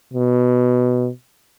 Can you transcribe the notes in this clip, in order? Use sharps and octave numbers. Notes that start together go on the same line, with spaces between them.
B2